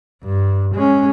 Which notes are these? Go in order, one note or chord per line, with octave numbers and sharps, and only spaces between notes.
G2
G#3 C#4